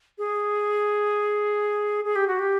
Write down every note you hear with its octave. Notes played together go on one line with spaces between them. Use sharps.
G#4
G#4
G4
F#4
G4